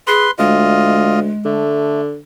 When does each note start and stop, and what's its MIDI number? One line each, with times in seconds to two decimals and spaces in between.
0.07 0.28 68
0.07 0.31 71
0.07 0.31 84
0.39 1.33 38
0.39 1.59 56
0.39 1.20 65
0.39 1.20 75
1.45 2.18 50
1.45 2.01 57